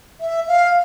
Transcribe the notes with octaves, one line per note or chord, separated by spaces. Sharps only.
E5
F5